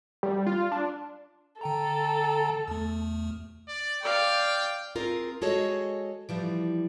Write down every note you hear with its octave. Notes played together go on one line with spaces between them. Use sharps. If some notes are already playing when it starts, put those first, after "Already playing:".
G3
F4
D4
D3 A4 G5 A#5
E2 A3
D5
D5 F5 G5
C4 F4 G#4 A#4
G#3 F#4 G#4 A4 C#5 D#5
E3 F3 G3